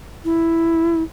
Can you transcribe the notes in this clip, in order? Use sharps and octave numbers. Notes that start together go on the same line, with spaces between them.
E4